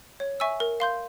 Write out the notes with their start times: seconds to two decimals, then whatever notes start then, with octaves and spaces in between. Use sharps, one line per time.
0.20 C#5
0.40 E5 G#5 C#6 E6
0.60 A#4
0.80 F5 C6 G6